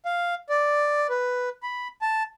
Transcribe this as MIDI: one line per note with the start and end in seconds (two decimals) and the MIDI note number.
0.05 0.34 77
0.49 1.07 74
1.09 1.49 71
1.63 1.88 83
2.02 2.23 81